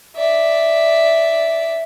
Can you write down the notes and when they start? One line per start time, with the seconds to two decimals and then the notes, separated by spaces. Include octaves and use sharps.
0.16 D5 E5